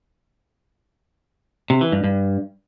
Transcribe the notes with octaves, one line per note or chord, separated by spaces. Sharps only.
C3
E3
G2
G2